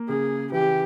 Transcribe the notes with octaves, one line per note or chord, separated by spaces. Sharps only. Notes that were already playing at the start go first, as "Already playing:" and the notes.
Already playing: A#3
C#3 G#4
E3 G4